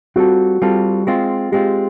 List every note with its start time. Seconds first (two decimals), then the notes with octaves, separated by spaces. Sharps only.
0.16 G3 C4 F4 F#4 A4
0.62 G3 C4 F4 A4
1.07 G#3 C4 F4
1.52 G#3 C4 F4 G4